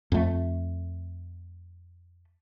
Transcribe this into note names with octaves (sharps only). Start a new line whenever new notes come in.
F2 A3